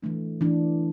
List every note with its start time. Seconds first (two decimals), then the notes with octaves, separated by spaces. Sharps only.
0.03 E3 A3 D4
0.41 E3 A3 D4